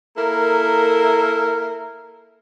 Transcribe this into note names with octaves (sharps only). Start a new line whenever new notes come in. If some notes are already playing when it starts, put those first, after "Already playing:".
A#3 E4 A4 A#4